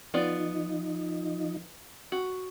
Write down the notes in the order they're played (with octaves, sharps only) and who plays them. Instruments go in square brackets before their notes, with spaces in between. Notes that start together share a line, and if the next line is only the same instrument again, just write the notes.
[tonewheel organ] F3 D#4 [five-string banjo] B3 F4 D5
[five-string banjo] F#4